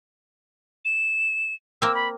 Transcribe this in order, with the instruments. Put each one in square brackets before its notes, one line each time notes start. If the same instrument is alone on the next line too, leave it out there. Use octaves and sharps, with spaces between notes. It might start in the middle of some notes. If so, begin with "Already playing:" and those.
[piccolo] E7
[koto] A#3 C4 [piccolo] E6
[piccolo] B5